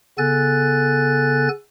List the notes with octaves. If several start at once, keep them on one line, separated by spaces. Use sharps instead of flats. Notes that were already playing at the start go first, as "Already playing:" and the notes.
C#3 B3 A4 G#5 F#6 A6